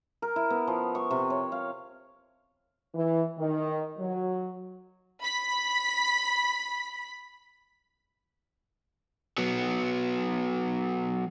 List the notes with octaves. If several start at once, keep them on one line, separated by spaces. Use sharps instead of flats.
A#4
E4
B3
F3
C#6
C3
C#5
F5
E3
D#3
F#3
B5 B6
F#3 B3